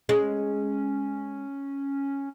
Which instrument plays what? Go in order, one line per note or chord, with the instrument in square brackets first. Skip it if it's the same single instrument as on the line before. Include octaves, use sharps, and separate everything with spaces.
[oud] G#3 [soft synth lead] C#4